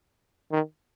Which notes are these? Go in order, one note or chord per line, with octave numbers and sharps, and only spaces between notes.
D#3